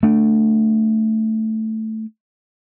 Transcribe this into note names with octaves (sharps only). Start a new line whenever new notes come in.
A3 D4